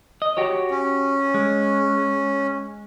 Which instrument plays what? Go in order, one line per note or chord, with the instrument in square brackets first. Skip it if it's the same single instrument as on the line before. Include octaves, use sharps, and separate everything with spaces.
[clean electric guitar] D#5
F#4 G4 C#5
[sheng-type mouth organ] C#4
[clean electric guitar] G#3